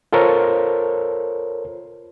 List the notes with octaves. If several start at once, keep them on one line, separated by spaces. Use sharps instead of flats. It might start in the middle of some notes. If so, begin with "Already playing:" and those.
F4 A4 A#4 C5 C#5